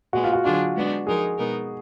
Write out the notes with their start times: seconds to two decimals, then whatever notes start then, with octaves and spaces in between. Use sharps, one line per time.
0.13 A#2 G#3 B3 F#4
0.24 F4
0.33 F#4
0.44 D3 F#3 D4 F4 F#4 G#4
0.75 G#3 B3 D4
1.07 F3 G#3 D#4 G#4 A#4
1.38 B2 G#3 B3 D#4 A#4